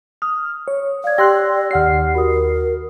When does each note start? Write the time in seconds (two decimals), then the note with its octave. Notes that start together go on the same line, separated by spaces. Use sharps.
0.22 D#6 F6
0.68 C#5
1.04 D5 F5 G#6
1.18 G4 G5 C6 E6 F#6 A#6
1.71 D#2 G4 F#5 F6 C7
2.15 F#4 A#4 D#6